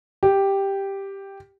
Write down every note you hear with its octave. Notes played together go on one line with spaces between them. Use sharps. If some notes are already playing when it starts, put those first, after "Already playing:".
G4